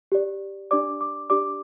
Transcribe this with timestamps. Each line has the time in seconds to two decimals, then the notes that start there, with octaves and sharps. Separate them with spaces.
0.12 G4 D5
0.71 D4 G4 D5 D6
1.01 D6
1.30 D4 G4 D5 D6